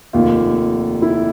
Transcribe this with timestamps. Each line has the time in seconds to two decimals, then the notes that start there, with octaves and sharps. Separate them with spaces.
0.13 F1 D#2 D#3 F4
1.02 E4